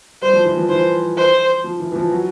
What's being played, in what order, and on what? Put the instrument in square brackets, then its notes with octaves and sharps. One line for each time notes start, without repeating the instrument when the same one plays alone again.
[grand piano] G3 [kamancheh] C5
[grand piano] F3
E3
F3
[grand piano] E3 [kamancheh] C5
[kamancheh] C5
[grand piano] F3
E3
E3
F3
F#3